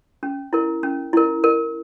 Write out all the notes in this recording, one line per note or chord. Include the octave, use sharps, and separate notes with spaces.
C#4
E4 A#4
C#4
E4 A#4
A#4